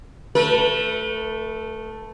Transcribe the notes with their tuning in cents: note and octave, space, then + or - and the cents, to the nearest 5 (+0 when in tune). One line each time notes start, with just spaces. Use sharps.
A3 +0 B4 -45